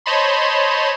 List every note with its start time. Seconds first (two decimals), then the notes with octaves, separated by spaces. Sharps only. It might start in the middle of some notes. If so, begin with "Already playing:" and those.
0.06 C5 C#5 D#5 A5 B5 C6